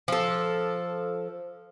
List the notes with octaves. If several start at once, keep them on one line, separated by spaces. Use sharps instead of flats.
F3 A4